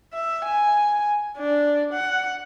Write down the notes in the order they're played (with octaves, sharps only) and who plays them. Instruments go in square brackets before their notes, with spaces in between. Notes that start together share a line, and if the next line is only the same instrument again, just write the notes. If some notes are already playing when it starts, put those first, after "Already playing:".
[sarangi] E5
G#5
D4
F#5